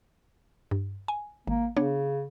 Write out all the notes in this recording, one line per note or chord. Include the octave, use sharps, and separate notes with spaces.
G2
G#5
G#1 A#3
C#3 B3 D4 C#5